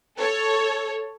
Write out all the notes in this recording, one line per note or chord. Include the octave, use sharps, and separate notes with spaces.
A4 C#5